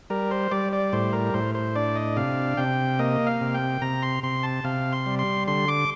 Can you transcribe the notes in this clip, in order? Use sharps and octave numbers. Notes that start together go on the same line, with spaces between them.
G3 A#4
C5
G3 D5
D5
A2 C5
A#4
A2 C5
C5
D4 D5
D#5
C3 F5
C3 G5
A#3 D#5
F5
C3
G5
C3 A#5
C6
C3 C6
A5
C3 F5
C6
G3
C6
D3 C6
D6